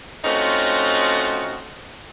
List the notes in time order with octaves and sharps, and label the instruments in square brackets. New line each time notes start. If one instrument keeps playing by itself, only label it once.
[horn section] A3 C4 C#4 D#4 F4 F#4